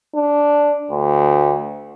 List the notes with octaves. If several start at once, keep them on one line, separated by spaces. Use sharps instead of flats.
D4
D2